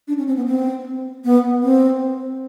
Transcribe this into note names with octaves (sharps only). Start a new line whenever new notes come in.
D4
C#4
C4
B3
C4
B3
C4